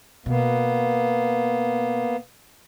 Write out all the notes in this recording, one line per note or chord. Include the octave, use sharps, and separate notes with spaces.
B2 A#3 B3